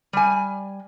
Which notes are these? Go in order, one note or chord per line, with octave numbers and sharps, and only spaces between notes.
G3 G#5